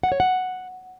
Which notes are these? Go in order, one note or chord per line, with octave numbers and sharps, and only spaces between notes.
F#5
C#5
F#5